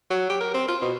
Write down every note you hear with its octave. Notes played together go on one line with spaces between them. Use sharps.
F#3
G4
A#4
C4
F4
B2